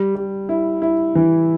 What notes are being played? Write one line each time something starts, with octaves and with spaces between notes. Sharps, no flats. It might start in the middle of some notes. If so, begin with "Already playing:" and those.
Already playing: G3
G3
E4
E4
E3